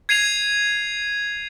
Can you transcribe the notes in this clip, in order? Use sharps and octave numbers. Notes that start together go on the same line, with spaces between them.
G#6 C7 D#7 F7